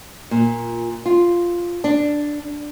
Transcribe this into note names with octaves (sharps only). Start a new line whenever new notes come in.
A#2
F4
D4